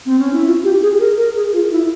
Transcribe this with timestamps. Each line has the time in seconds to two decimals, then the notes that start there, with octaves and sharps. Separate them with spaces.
0.06 C4
0.19 C#4
0.33 E4
0.46 F4
0.64 G4
0.82 G#4
1.00 A#4
1.18 A#4
1.36 G#4
1.53 F4
1.71 E4